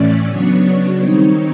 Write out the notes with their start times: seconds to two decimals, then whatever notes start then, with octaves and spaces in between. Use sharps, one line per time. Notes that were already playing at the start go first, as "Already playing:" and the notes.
Already playing: A2 E3 A3 C#4 D5
0.27 C#3 F#3 B3 D4 C#5
1.00 D#3 G3 C4 D#4 C#5